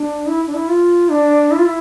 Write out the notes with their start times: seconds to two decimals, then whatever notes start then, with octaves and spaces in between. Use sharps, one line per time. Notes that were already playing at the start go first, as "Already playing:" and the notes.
Already playing: D4
0.27 E4
0.47 D4
0.54 E4
0.69 F4
1.09 D4
1.51 E4
1.58 F4
1.66 E4